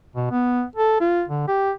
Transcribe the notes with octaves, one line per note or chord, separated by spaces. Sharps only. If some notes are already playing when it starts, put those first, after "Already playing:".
B2
B3
A4
F4
D3
G4